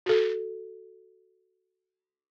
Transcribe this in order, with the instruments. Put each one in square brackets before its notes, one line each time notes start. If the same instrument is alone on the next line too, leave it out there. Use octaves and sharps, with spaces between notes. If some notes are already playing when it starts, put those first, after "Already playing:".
[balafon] F#4 A4